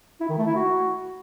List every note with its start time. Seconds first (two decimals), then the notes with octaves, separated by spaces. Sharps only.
0.20 E4
0.29 D#3
0.38 A3
0.47 E4
0.55 F#4